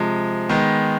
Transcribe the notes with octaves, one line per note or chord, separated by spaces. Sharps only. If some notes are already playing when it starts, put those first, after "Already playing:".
Already playing: C3 F3 G#3
D#3 G#3 B3